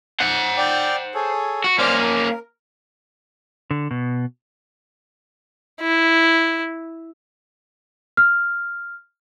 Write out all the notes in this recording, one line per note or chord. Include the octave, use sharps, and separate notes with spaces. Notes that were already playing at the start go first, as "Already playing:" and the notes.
C5 F#5
D5 G5
G#4 A4 C#5
F#4
A#3 C#4 C5 D5 F6
A#4
D3
B2
E4
F6